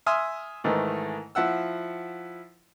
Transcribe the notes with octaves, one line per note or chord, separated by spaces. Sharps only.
E5 G#5 C6 D#6 F6
G#2 D#3 E3 A3
F3 E4 F#5 E6